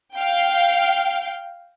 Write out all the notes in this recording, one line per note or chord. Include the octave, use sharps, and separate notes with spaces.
F5 G5